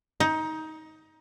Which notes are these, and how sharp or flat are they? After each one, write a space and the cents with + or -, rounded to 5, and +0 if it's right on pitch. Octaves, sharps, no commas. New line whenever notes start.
D#4 +20